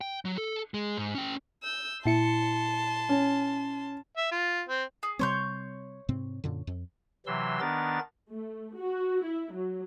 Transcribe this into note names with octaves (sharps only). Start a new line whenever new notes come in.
G5
F#3
A4
G#3
G#2
C#4 G5
E6 G6
A#2 E4 A5 C6 C#7
C#4
E5
F4
C4
G#4
C3 G3 C4 C#5 C6 G6
G#2 C3 C4
F#2 A#2 D3
F2
C3 E3 F#3 C6 E6
D#3 B3 D4 A#4 A6
A3
F#4
E4
F#3